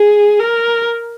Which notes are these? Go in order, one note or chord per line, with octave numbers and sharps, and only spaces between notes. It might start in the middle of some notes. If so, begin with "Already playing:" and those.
Already playing: G#4
A#4